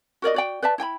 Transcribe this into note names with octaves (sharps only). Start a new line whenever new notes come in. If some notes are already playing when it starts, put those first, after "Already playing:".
F#4 A#4 D5 D#5
F#4 D5 G5
B4 D5 E5 A5
E4 G5 G#5 B5